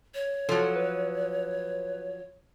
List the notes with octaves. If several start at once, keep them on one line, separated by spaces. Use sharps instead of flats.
C#5
F3 F#3 A4
B4